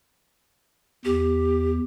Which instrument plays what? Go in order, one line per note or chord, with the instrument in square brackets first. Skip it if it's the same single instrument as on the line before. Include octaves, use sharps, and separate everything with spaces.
[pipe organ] E2 [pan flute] G4